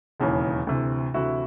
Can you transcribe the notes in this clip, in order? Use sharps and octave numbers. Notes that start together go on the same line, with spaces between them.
E1 D#2 C#3 E3
D2 C3 E3
D2 C3 E3 E4 F#4